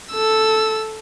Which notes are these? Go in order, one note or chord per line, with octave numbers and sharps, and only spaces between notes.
A4 E6